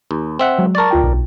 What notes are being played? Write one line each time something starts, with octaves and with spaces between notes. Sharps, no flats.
D#2
C4 E5 F#5
F#3 G#3
A#4 D5 A5 C#6 A6
D2 F4 G5
B1